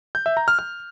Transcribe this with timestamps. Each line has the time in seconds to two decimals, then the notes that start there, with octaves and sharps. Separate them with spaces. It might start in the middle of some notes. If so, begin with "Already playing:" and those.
0.15 G6
0.26 E5
0.37 A#5
0.48 F6
0.59 F6